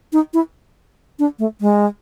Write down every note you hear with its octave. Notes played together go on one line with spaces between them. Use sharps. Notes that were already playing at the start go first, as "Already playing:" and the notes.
D#4
E4
D4
A3
G#3